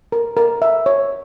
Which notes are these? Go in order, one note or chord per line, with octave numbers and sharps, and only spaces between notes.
A#4
A#4
E5
C#5